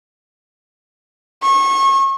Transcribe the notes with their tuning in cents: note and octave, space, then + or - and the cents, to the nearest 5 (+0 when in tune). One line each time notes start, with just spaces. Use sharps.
C#6 -30